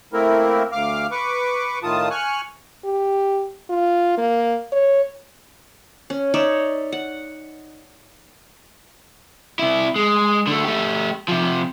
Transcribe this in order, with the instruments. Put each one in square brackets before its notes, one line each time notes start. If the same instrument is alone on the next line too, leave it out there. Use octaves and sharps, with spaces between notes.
[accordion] A3 A#3 C4 E4 A#4
D2 F5 D6 F6
B4 C#6 D6
A2 D#3 F4 A5 D#6
G#5 C#6 F6 F#6
[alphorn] G4
F4
A#3
C#5
[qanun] C#4
D#4 C#5 D5 E5
F#5
[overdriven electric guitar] C3 E4
G#3
D3 A3
A3 G4
C3 F3